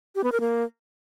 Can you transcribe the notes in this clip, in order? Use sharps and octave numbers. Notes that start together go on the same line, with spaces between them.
G4
B3
A#4
A#3